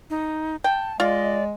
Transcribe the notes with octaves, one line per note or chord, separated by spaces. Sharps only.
D#4
G5 A5
G#3 F4 D5 D#5